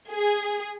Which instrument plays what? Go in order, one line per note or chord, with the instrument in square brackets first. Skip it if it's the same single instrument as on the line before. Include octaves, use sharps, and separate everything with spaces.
[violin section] G#4